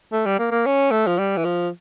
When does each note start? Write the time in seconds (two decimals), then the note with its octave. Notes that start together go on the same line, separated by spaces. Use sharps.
0.12 A3
0.26 G3
0.39 A#3
0.51 A#3
0.66 C#4
0.91 A3
1.07 F3
1.18 G3
1.37 E3
1.45 F3